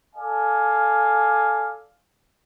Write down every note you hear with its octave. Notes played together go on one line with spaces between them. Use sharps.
A4 D5 F5 G#5